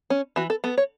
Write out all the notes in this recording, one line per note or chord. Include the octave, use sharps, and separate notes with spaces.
C#4
E3 F#4
A4
B3 A4
C#5